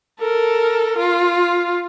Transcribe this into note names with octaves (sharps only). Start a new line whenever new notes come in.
A4 A#4
F4